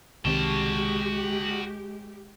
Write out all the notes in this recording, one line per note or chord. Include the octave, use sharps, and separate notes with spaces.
C2 D#3 G#3 C4 F#4 G4 A5